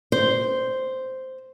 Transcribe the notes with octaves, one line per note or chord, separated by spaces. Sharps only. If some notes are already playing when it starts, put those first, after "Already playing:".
C5